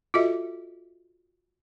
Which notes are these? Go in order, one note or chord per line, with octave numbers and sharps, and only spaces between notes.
F4 F#4 A4 D#5 E5